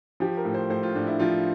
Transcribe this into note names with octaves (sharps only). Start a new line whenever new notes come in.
F3 G4
A#4
A2
C5
A2 C5
F4
A2 D4
E4
F3 F4